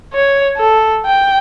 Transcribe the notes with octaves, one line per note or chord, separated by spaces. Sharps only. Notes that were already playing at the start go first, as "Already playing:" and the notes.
C#5
A4
G5